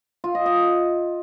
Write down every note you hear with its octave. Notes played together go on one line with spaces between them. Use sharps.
F4
D#5
D#5